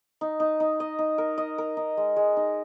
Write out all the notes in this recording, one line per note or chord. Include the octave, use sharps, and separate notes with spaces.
D#4
D#4
D#4
D#5
D#4
A#4
D#5
A#4
D#4
G#3
G#3
D#4